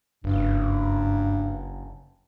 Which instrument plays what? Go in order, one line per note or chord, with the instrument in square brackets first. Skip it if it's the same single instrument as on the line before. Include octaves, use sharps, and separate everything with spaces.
[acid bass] F#1 [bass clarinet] G2